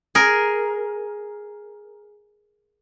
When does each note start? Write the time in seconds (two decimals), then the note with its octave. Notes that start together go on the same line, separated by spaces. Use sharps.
0.15 G#4 A#4